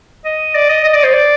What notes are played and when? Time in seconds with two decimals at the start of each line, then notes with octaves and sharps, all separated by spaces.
0.25 D#5
0.55 D5
0.69 D#5
0.84 D#5
0.94 D5
1.03 C5
1.13 D5